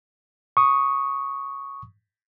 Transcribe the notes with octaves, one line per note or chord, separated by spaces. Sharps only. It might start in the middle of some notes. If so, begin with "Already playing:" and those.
C#6 D#6